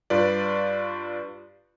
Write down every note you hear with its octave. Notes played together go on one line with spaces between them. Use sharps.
G2 F4 B4 D5